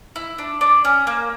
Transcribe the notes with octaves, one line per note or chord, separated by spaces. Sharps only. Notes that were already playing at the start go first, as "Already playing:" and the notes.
E4
D4
D4
C#4
A#3